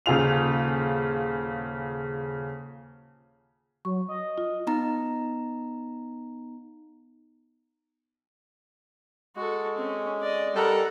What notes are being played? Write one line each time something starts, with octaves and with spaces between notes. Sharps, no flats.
D#1 C#3 F4 F7
F#3 C#6
D#5
F4
B3 D#4 A#5
G#3 F#4 A4
C4 C#4
D5 D#5
G3 A4 A#4 F#5 A#5